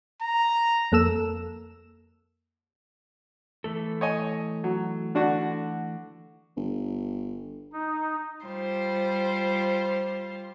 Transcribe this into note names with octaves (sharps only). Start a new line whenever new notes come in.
A#5
F2 A#3 A4 E6 E7
E3 A3 A4
C#5 D#5 G#5
F#3
D3 D4 F#4
G1
D#4
G3 F4 C5